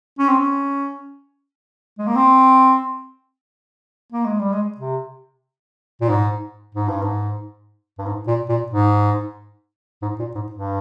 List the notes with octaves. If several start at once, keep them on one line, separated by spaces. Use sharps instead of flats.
C#4
C4
C#4
G#3
A#3
C4
A#3
G#3
G3
G#3
C3
A#2
G#2
G#2
G2
G#2
G2
G#2
A#2
A#2
G#2
G#2
A#2
G#2
G2